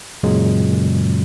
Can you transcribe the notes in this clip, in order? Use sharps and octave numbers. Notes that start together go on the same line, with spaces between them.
F#2 A#2 C#3 F#3 G#3